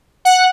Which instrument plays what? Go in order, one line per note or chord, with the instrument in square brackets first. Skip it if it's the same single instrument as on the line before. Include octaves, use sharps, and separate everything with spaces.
[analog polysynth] F#5